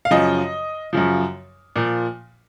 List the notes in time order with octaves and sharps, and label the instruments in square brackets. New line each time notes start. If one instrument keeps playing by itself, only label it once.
[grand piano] F5
F#2 C#3 F3 D#5
F#2 C#3 F3
A#2 F3